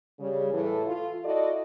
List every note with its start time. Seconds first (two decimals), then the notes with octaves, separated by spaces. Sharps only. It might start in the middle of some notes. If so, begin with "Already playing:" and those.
0.19 C#3 G3
0.53 A2 E3 A4
0.86 F4
1.25 E4 F#4 A4 D5 D#5